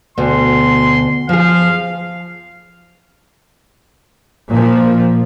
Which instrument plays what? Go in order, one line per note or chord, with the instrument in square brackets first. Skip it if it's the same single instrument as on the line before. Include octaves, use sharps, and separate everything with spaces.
[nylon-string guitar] D2 B2 [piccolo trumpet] C6
[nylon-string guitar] F3 G#4 [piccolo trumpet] F5
[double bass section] A#2 F3